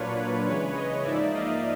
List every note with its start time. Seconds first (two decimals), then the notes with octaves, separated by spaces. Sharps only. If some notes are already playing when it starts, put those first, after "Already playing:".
Already playing: A#2 F#3 A#3 D4 F4 B4 C#5
0.17 B4
0.46 C#3 E3 G#3 B4 C#5
0.75 C#5 D#5
1.04 G#2 F3 A#3 D#4 D5 E5
1.33 D#5 F5